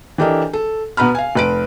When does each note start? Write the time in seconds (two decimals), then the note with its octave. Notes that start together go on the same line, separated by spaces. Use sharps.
0.18 E3 D4 G4 A4 A#4 D#5
0.53 A4
0.97 B2 B3 B4 A#5 B5 F6
1.15 F5 G#5
1.35 F1 B4 D7